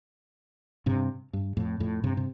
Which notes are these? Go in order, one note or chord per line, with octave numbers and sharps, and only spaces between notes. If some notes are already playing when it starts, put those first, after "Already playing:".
G2 C3
G2
F2 A2
F2 A2
G2 C3
C3